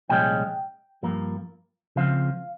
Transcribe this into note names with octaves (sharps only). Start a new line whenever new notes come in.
C2 A#2 F3 G#3 C#4 G5
G2 F3 A#3
C#2 C#3 F3 C4 F5